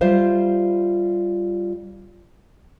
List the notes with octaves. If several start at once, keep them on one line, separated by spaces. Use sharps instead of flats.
G3 F4 C5 E5 F5